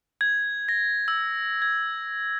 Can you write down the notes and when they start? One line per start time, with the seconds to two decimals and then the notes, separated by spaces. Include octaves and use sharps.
0.21 G#6
0.69 A#6
1.08 E6
1.62 G#6